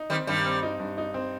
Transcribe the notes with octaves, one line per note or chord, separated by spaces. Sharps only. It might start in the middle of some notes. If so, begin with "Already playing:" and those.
Already playing: D#4
D#3 G3 C4
G2 D#3 G3
C4
D#4
G2
D#4
C4